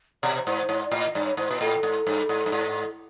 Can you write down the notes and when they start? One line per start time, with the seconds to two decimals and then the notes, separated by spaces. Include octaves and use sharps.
0.23 B2 D5
0.35 C5
0.46 G#2 C5
0.58 C5
0.69 G#2 C#5
0.85 D5
0.92 A2
1.00 D#5
1.15 G2 D5
1.26 C#5
1.37 G#2 C5
1.49 A#2 B4
1.61 A2 A4
1.83 G#2
2.07 G2
2.29 G#2
2.46 G2
2.52 G#2